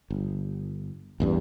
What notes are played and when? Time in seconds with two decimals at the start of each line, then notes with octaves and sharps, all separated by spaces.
0.10 G1
1.20 A1 E2 G2